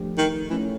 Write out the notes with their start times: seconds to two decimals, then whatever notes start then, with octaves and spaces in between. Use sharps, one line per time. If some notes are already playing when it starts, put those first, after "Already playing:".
Already playing: F3 A3 D4 G4
0.18 D#3
0.50 E3 A3 C#4 E4